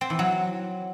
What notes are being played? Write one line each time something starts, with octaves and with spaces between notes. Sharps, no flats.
C4
E3
F#3